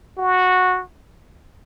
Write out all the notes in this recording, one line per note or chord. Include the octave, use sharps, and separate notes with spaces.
F#4